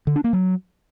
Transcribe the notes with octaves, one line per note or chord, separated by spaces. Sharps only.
D3
D4
A#3
F#3